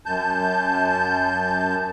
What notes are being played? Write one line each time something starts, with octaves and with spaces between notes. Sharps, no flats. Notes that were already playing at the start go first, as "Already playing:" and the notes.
F#2 A5 G6